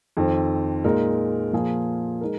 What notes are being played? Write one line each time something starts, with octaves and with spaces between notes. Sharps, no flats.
F2 D#3 C4
A#2 G#3 D#4 A#4
A#2 F3 A#3 G#4
G#3 D#4 A#4